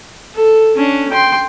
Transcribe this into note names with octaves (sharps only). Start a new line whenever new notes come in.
A4
C#4 D4
G5 C6